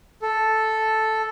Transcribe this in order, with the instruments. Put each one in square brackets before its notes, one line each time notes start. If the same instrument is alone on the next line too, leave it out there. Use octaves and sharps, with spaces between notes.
[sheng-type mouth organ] A4